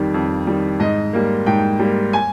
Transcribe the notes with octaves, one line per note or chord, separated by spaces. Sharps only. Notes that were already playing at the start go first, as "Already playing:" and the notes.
Already playing: F2 D#3 G3
F2
D#3 G3
G#2 D#5
G3 A#3
G#2 G5
G3 A#3
G#5